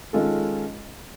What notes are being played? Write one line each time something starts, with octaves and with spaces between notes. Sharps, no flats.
D#3 G#3 C#4 F4 A4